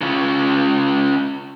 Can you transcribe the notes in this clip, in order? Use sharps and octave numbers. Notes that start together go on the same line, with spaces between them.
C#3 F4